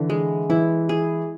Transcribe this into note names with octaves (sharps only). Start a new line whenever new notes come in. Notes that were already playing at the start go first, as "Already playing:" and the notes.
Already playing: D3 E3
G#3
E3 E4
G#4